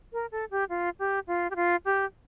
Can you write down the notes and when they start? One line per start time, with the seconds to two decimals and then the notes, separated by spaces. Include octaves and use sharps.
0.13 A#4
0.32 A4
0.51 G4
0.69 F4
0.99 G4
1.27 F4
1.51 G4
1.56 F4
1.85 G4